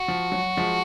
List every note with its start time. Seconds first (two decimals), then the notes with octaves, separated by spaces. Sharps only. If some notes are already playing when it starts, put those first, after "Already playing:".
Already playing: F#4
0.08 F3
0.32 F#3
0.57 F3 G#3